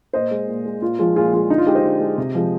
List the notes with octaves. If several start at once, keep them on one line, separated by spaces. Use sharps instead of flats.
A#2 C5 D#5
G#3
A#2
G#3
A#2 F4
F3 G#3 F4
A#2 F4 G#4
F3 G#3 F4
D3 D#4
F4
G#3 D#4 G4
C5 D#5
D3
G#3
C3
F3 G#3